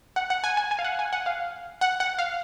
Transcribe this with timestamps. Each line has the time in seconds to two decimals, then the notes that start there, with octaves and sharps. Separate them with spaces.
0.16 F#5
0.30 F#5
0.44 G#5
0.57 G#5
0.71 G#5
0.79 F5
0.84 F#5
0.99 G#5
1.13 F#5
1.26 F5
1.81 F#5
2.00 F#5
2.19 F5